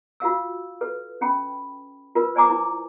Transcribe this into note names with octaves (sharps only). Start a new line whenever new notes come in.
F4 F#4 F5 E6
A4 B4
C#4 G5 B5
F4 A#4 B4
C5 D5 G#5 A#5 D6 D#6
E4